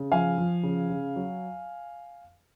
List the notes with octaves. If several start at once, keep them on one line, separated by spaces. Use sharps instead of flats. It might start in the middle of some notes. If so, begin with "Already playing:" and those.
Already playing: C#3
F3 F5 G#5
F3
C#3
C#3
F#3